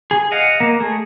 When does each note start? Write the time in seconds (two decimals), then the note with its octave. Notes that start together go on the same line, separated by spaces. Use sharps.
0.11 G#4
0.32 D#5 F5 F#5
0.60 A#3
0.80 A3 G#4